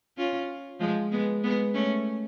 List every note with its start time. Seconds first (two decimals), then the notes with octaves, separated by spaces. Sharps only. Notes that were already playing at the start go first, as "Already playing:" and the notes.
0.17 C#4 F4
0.80 F3 G#3
1.11 G#3 B3
1.43 G#3 B3
1.74 A3 C#4